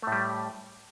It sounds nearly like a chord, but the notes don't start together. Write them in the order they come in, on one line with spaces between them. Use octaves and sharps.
A3 A2 G3